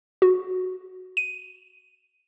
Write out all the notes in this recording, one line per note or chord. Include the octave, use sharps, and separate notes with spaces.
F#4
D#7